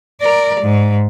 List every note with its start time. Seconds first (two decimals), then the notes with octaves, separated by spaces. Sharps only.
0.21 A#4 D5
0.60 G#2